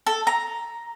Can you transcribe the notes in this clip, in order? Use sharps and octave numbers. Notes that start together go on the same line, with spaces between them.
A4
A#5